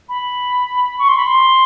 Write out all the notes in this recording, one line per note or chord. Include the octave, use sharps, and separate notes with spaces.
B5
C#6
C6
B5
C6